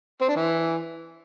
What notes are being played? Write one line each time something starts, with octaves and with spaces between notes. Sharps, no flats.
C4
D4
E3